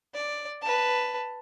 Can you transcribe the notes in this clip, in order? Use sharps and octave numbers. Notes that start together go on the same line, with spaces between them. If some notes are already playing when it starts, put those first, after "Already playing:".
D5
B4 A5